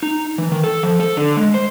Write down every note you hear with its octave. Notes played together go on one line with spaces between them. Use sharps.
D#4
E3
D#3
A4
F3
A4
D3
G#3
C5